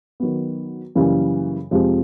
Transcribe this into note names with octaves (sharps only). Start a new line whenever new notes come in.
D#3 F#3 B3
F#2 C#3 E3 G3 A#3
F2 C3 F3 G#3 C4